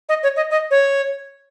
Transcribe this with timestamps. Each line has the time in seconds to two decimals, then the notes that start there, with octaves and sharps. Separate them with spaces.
0.09 D#5
0.23 C#5
0.37 D#5
0.51 D#5
0.71 C#5